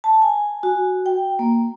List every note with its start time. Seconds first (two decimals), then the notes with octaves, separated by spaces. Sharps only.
0.04 A5
0.22 G#5
0.63 F#4
1.06 G5
1.39 A#3